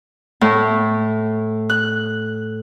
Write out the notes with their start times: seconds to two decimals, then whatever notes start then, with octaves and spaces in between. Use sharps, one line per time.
0.41 A2
1.69 F#6